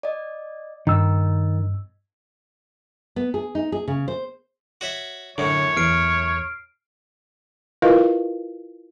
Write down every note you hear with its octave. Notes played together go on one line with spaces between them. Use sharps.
D5 D#5
G2 D#3 D#5 E6
B3
G#4
D#4
G#4
C#3
C5
F#4 C#5 E5
F#2 A2 D3 C#5
E2 F6 C7 D7
E4 F4 A#4 B4 D#5 F5